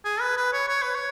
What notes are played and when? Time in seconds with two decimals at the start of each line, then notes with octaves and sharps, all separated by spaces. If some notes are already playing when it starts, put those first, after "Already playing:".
0.05 G#4
0.20 B4
0.37 B4
0.53 C#5
0.69 C#5
0.82 B4
0.95 C#5